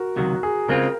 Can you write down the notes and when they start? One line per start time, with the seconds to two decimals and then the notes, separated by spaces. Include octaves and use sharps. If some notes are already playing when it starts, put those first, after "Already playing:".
Already playing: F#4 A#4
0.16 C#2 C3 D#3 F#3 F#4
0.43 G#4
0.69 C#3 G#3 C4 F4 A#4